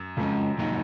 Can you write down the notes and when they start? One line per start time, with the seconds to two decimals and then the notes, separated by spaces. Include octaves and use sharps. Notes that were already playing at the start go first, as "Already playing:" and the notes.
Already playing: F#2
0.17 F2 C#3 G#3 C#4
0.58 C3 F#3 A#3 D#4